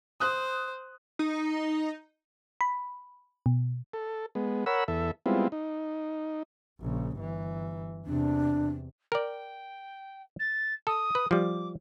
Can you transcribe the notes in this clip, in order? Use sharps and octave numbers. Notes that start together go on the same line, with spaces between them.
C5 D#6 F#6
D#4
B5
B2
A4
G#3 B3
A#4 C#5 F#5 B5 E6
E2 A4 E5
G3 G#3 B3 C4 E4 F4
D#4
A#1 C#3
G1 E3
E2 C3 D4
A#4 D5 G5
A6
A4 D#6
B4
F3 G3 D6